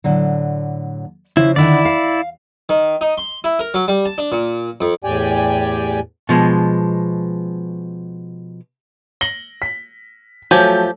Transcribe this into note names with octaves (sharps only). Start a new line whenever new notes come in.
A2 D3 F#3
C#3 F3 E4 C5
D3 D#3 E4 D5 F#5
F5
D#3
D#4
C6
E4
A#4
F#3
G3
A5
D4
A#2
F2
E2 A2 G4 D5 G5 G#5
B2 F3 G#3
A#6 F#7 G7
B6
F3 F#3 A3 G4 G#5